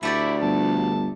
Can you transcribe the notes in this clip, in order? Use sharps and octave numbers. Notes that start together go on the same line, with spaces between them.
D2 A3 E4 G4 D5
G1 A5